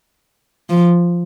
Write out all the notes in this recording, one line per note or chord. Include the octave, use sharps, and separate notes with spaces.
F3